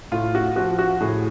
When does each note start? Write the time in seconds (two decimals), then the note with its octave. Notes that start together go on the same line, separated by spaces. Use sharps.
0.12 A2 F4
0.35 F#4
0.56 F3 F#4
0.79 F#4
1.01 A2 G#4